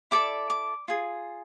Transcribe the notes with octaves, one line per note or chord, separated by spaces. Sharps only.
E4 A4 D5 D6
D6
F4 G#4